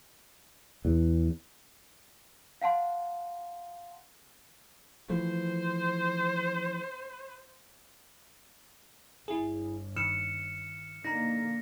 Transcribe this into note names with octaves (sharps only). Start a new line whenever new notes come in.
E2
F5 F#5 A5 C6
E3 F3 A3 C5
G1 E4 G#4
D#3 F6 C#7 E7
D3 A#3 D#4 A#5 A#6